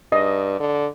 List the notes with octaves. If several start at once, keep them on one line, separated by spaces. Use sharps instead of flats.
G2 D#5
D3